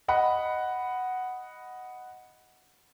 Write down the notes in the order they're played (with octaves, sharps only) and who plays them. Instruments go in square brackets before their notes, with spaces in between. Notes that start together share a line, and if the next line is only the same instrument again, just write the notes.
[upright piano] D#5 F#5 B5